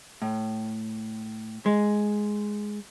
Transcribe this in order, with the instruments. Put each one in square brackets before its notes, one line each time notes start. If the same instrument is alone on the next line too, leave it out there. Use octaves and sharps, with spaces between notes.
[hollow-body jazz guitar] A2
G#3